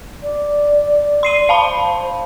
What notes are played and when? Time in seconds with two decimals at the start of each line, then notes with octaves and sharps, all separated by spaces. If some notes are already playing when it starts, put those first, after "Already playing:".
0.23 D5
1.23 C6 C7 D#7
1.49 C5 F5 A5 B5